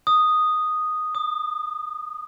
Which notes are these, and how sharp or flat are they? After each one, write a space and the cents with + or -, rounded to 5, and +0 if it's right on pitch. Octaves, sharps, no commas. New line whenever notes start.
D#6 -5
D#6 -40